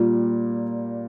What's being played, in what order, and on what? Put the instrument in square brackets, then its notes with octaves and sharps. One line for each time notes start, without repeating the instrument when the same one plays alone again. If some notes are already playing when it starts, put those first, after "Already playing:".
Already playing: [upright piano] A#2 G3 A#3 [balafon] F4